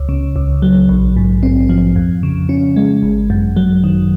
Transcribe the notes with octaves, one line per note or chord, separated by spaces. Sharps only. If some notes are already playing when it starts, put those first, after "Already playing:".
Already playing: C#2
C#3
C#2
F#3
A#1
G#2
C4
F3
F2
C#3
C#4
G#3
G#1
F#2
F#3
D#3